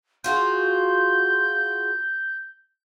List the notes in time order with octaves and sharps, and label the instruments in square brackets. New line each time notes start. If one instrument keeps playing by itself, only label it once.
[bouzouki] F4 F#4 G#4 [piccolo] G6